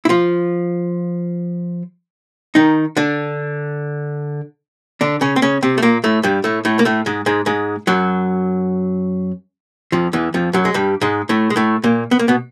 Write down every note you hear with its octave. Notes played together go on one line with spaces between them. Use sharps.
E4
F3 F4
D#3 D#4
D3 D4
D3 D4
C#3 C#4
C4
C#3 C#4
C3 C4
A3
A#2 A#3
A2 A3
G2 G3
A2 A3
A2 A3
A#3
A2 A3
G#2 G#3
G#2 G#3
G#2 G#3
F#2 F#3
F2 F3
E2 E3
F2 F3
F#2 F#3
G#3
G2 G3
G#2 G#3
A2 A3
G#3
A2 A3
A#2 A#3
B3
A#3
B2 B3